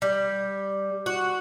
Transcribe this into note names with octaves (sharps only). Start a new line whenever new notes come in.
G3
F#4